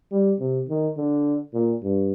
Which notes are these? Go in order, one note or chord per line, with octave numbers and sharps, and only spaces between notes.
G3
C3
D#3
D3
A#2
G2